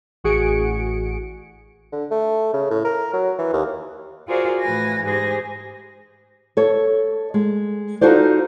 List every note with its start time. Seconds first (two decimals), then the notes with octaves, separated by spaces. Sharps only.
0.24 A1 F#4 G#4 C#7 D7
1.92 D3
2.11 A3
2.53 C#3
2.70 A2
2.85 A#4
3.13 F#3
3.38 E3
3.53 D#2
4.27 F4 F#4 G#4 A#4 C5 D5
4.61 A2 E3 B4 G#5 A#6
5.04 G#2 G4 G#4 C5 A#6
6.57 A4 C#5
7.34 G#3
8.01 D#4 F4 F#4 A4 C5 D5